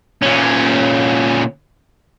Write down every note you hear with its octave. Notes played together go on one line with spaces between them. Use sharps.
A#2 C#4